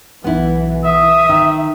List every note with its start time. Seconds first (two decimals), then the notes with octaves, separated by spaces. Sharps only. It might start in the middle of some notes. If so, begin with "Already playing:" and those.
0.24 B1 E3 B3 E4
0.85 E5 D#6
1.29 D#3